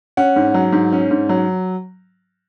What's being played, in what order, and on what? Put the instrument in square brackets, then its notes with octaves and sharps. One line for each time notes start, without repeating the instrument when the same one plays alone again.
[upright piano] C#4 F#5
G#2
F#3
G#2
C#4
G#2
F#3